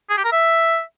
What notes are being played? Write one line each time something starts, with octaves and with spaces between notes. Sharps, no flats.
G#4
G4
A#4
E5